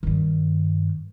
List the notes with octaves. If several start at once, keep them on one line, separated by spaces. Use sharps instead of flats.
G2 D#3